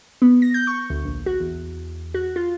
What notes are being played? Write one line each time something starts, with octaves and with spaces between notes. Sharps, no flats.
B3
A#6
G6
C#6
D2
A#1
F#4
E2
F#4
F4